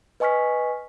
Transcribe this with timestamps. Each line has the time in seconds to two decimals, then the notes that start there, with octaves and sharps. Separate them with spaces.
0.20 B4 D#5 G#5 C#6 F6 B6